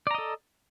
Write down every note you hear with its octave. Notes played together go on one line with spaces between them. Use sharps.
A4 D5 D#5 A#5